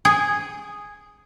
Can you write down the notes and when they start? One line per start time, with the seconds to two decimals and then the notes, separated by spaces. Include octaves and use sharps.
0.05 G#4